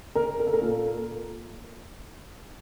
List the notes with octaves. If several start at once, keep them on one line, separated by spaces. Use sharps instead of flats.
A#4
A#4
A4
A#4
A#2 A4